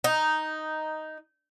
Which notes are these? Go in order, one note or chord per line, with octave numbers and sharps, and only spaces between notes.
D#4